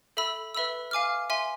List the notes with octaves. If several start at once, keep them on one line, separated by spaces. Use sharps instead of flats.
A4 E5 B5 E6
B4 E5 B5 E6
F5 G#5 D6 F6
E5 G#5 C6